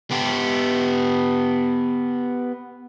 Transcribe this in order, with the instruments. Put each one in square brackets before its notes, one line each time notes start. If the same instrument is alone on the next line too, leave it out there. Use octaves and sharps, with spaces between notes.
[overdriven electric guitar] B3 G4